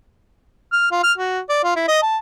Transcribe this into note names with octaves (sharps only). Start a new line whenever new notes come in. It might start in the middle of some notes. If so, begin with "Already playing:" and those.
F6
F4
F6
F#4
D5
F4
E4
D#5
A5